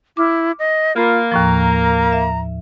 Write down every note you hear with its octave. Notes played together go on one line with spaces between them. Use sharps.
E4 D6 F6
D#5
A#3 F4 B5
D#2 A2 F3 A#5
E5